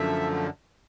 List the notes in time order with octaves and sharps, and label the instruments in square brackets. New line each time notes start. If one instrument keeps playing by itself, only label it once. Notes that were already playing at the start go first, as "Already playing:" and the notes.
Already playing: [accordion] F#2 D3 F3 A3 E5